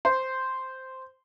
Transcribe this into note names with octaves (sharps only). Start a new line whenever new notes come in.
C5